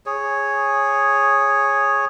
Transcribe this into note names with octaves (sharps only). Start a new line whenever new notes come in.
G#4 C#5